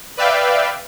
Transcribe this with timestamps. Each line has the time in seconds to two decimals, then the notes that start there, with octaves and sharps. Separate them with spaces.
0.17 B4 D5 E5 F5 G5